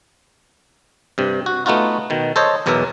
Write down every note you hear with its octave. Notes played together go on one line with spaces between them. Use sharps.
G2 C3
F#4
A3 B3 D#4 F4 F#4
B2 D#3
A4 C5 C#5 D#5
B1 E2 B2 F#3 A#4 E5